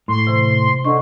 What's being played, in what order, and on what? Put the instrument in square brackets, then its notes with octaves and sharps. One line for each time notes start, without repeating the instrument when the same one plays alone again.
[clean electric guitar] A2 [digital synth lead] C6
[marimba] C3 E3
[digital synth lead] D3 [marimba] D#5 C#6